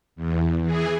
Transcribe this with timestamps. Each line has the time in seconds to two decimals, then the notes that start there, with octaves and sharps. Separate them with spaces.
0.16 E2
0.62 E3 G#4